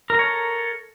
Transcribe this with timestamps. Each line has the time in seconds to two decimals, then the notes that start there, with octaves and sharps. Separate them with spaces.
0.10 A#4
0.14 A#5
0.19 C#5
0.24 A4